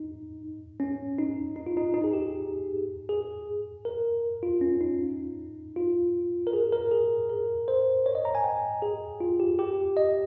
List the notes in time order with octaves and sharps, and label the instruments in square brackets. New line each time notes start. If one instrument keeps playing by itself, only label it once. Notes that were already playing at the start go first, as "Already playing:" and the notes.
Already playing: [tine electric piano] D#4
C#4
D#4
D#4
F4
D#4
D#4
G#4
G4
G#4
A#4
F4
C#4
D#4
F4
A#4
G#4
A#4
G#4
A#4
C5
C#5
D#5
A#5
G#5
G5
G#4
F4
G4
G4
D#5